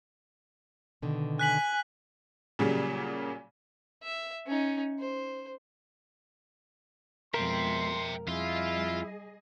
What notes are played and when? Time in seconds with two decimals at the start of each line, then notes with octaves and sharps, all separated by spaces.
1.02 B2 D3 D#3
1.39 G#5 F#6 B6 F#7
2.59 A#2 C#3 F#3 G3 A#3
4.03 E5
4.47 C#4 D#4
4.99 C5
7.34 F2 B2 G#3 A#4 E5 G5 C6
8.28 F2 G3 E4 F4 G#4 D#5